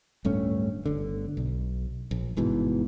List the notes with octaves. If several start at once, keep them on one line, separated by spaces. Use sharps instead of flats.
D1 G2 A3 C#4
G1 D3
B1
A#1
G1 G#2 B2 E3